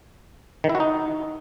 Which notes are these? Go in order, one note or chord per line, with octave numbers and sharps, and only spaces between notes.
D#3
E4
F#4
D#4